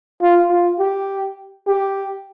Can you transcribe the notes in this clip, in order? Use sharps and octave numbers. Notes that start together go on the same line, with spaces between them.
F4
F4
G4
G4